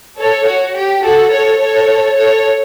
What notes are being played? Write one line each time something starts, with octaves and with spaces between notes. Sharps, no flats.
A4 C#5
F#4
G4
F#4 A4
A4 C#5
A4 C#5
A4 C#5